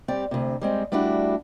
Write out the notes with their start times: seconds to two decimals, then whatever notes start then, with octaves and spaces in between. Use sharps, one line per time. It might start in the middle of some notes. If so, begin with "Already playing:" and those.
0.08 G3 C4 G4 D5
0.31 D2 C3
0.61 G3 G#3 C4
0.92 G3 A3 D4 E4 F#4